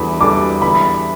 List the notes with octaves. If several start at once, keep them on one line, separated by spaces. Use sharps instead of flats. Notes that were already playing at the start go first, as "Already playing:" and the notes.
Already playing: E2 E3 G3 D4 A4 B5
E3 G3 D4 A4 D6
E2 B5